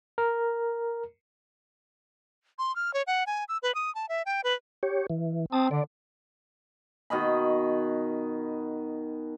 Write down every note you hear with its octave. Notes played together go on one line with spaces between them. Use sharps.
A#4
C6
F6
C#5
F#5
G#5
E6
B4
D#6
A5
E5
G5
B4
G4 C#5
E3
C4 A5 D#6
D3 D5
B2 D#3 D#5 B5